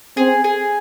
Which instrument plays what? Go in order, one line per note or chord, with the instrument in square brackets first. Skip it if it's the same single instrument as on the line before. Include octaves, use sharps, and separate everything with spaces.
[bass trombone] C4 [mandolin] G#4
[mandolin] G#4